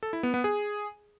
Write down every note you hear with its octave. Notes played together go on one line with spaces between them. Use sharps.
A4
E4
B3
B3
G#4